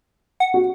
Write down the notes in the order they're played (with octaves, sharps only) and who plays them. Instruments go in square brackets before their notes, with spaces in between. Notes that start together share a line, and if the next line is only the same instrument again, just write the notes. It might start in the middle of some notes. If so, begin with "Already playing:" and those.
[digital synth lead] F#5
[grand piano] F#4